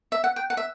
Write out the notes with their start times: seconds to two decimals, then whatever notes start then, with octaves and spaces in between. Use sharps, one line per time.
0.12 E5
0.24 F#5
0.36 G5
0.50 F#5
0.57 E5